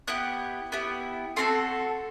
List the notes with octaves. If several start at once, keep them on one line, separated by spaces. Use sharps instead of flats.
B3 E4 G4 F#6
B3 E4 G4
A3 C4 F#4 A4 C6